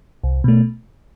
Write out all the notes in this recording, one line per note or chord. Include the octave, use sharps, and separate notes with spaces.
C2
B2 A3